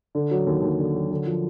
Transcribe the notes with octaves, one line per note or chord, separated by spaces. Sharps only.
D3
F#3
D#2
D#2
D3
F#3
D3
F3